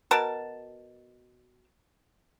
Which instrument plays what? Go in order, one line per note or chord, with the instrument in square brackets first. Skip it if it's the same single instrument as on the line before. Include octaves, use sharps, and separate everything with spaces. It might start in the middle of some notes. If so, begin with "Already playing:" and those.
[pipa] B2 F#4 A#4 A5